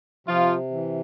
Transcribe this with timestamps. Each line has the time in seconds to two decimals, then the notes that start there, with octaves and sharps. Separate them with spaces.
0.26 C3 F3 F4
0.71 E3